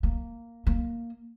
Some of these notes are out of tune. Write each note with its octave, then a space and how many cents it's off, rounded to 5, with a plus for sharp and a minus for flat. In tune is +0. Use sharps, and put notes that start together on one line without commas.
A#3 -5
A#3 +0